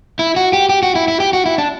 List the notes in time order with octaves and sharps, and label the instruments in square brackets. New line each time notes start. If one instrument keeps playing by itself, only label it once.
[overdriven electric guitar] E4
F#4
G4
G4
F#4
E4
E4
G4
F#4
E4
D4